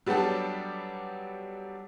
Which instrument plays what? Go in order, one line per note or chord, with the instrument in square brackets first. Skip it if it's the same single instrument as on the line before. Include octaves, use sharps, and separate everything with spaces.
[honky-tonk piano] F#3 G3 B3 D4 G4 A4